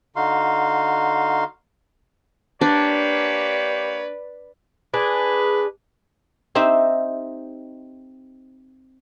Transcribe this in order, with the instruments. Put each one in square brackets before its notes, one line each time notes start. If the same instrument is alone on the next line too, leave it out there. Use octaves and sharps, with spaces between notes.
[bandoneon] D3 D#4 F#4 F5 C6
[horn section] A#3 G4 C#5 [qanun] D4 [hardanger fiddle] B4 D5
[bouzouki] D4 G#4 [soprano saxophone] B4
[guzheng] C4 D#4 G4 C5 E5